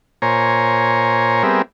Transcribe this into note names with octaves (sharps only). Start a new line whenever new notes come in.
A#2 C5 C#5 G#5 A#5
G3 B3 C4 G#4 A#4 E5